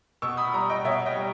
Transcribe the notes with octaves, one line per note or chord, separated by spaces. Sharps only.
B2 C#6 E6
B5 D#6
G3 A#5 C#6
D#5 G5
B2 C#5 E5
D#5 G5
G3